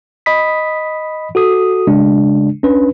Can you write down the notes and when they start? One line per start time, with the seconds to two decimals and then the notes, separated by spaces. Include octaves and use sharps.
0.26 D#5 B5 D#6 B6
1.35 F#4 A4 D#6
1.87 C#3 G#3 D4
2.63 C#4 D4 B4